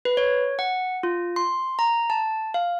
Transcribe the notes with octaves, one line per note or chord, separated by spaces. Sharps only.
B4
C#5
F#5
F4
C6
A#5
A5
F5